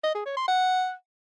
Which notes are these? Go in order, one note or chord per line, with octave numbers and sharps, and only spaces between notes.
D#5
G#4
C#5
C6
F#5